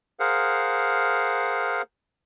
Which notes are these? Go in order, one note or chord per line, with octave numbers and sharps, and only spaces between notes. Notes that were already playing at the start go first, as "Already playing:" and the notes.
G#4 A#4 C5 F5 F#5